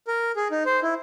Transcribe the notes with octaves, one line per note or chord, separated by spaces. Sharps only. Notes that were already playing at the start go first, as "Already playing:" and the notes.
A#4
G#4
D#4
C5
E4